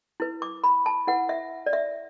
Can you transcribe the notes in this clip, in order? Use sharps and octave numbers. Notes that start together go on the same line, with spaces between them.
E4 B4
D6
B5
A5
E4 B4 F#5
E5
D5
E5